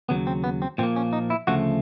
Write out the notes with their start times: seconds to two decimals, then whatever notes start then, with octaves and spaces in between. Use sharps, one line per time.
0.09 D#2 C#3 F#3 B3
0.27 C4
0.44 B3
0.62 C4
0.78 A#2 F3 A#3 C4
0.96 C#4
1.13 D#4
1.30 E4
1.47 D2 C#3 F3 A3 F#4